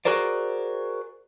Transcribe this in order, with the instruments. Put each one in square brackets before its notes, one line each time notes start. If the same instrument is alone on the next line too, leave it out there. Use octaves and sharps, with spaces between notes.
[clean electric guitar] F#4 G#4 A#4 C5 D5